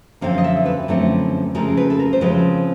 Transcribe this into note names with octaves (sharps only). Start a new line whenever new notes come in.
F#2 D3 F3 C4 F5
D#5
E5
B4
F#2 D3 F3 A3 C4
C#3 F3 G#3 C4 A#4
B4
A4
A#4
C5
C#3 F3 G#3 C4 B4